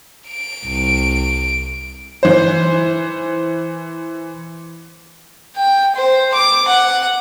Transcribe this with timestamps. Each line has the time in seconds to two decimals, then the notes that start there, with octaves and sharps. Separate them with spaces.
0.29 D7
0.64 C2
2.23 E3 C5
5.56 G5
5.96 C5
6.34 D6
6.68 F#5